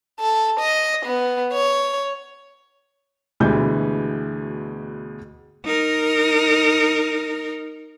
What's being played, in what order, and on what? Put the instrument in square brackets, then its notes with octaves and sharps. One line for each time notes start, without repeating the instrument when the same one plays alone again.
[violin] A4
D#5
B3
C#5
[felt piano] D2 B2 E3 G#3 G4 G6
[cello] D#4 A#4